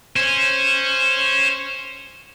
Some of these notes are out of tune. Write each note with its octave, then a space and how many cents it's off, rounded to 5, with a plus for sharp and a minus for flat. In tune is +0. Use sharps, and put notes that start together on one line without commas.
C#4 -10 C5 +0